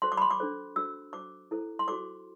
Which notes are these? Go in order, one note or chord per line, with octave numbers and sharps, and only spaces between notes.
F#4 A4 C5 C6
D6
B5
C6
D6
D4 A4 C5
D4 F#4 A4 C5 E6
F#4 C5 D6
E4 A4 C5
C6
F#4 A4 C5 D6